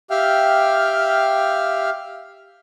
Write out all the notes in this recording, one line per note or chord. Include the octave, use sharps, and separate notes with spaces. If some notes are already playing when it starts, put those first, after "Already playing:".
G4 E5 F5 G5 F6